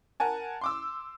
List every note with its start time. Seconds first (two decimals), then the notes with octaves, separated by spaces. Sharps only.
0.20 A#4 F#5 G#5 A5
0.61 C6 D6 E6